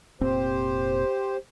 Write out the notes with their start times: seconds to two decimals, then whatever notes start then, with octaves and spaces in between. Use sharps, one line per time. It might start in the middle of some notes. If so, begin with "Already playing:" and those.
0.21 F1 A#2 C4 G4 C5